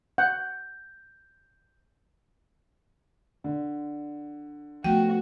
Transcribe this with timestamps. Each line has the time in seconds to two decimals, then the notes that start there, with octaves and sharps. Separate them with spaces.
0.18 F#5 G6
3.44 D3
4.84 F3 A3 B3 F#4 G5